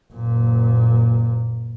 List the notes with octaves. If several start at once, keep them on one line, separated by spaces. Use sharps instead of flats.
F#1 A#2